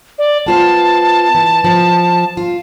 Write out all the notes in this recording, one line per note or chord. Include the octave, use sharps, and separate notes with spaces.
D5
B3 F4 C5 A5
E3
F3
F4